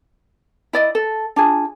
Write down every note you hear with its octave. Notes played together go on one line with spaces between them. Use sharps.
E4 D5 D#5
A4
D4 F4 G#4